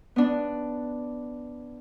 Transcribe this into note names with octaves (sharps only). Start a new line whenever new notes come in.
B3 D4